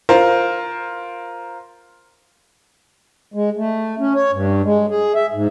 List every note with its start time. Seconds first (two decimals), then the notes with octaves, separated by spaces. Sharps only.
0.09 F4 A#4 C5
3.34 G#3
3.57 A3
3.99 C#4
4.15 C#5
4.33 G2
4.65 G#3
4.90 G#4
5.15 E5
5.33 G#2